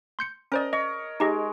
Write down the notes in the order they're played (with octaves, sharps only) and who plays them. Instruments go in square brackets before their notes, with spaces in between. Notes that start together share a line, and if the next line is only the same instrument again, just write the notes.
[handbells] C6 G6 C#7
[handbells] C#4 C5 D5 [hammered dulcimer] A#4 D#5
[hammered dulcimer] C#5 [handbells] D#5
[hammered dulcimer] G#3 [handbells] D#4 G4 D#5